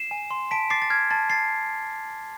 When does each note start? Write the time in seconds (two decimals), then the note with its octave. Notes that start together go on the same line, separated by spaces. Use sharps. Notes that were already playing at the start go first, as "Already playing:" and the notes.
Already playing: C7 E7
0.11 G#5
0.31 C6
0.51 A5 B6 D7
0.70 D6 A6 C7
0.82 A6
0.90 F6 G#6
1.11 A5 A6
1.30 A5 A6 C7